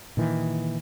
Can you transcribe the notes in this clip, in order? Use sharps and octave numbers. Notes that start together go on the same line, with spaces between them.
A#2 D#3 E3